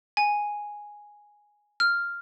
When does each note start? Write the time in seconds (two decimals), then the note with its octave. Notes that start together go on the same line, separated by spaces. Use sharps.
0.17 G#5
1.80 F6